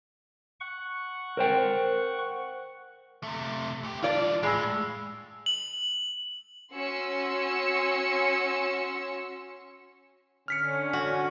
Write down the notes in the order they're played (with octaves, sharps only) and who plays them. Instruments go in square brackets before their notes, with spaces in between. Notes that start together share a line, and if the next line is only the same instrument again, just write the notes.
[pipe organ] F#5 C#6
[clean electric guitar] A#4 C5 G5
[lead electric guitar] C3 A3
A3 G4
[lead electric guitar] E3 D4 [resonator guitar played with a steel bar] F4 D5
[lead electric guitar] A2 [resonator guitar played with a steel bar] G#3 [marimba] B5 E6
[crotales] F#7
[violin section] C#4 F#4 C6 E6 C#7
[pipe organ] D3 C#4 [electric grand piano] F6 B6 C#7
[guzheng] F#4